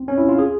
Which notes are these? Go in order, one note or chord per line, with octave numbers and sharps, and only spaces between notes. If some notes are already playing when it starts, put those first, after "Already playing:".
Already playing: C4
C#4
E4
F4
G#4